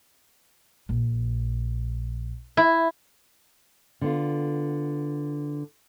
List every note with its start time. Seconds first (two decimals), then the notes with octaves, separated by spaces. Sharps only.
0.89 A#1
2.57 E4
4.01 D3 B3 F4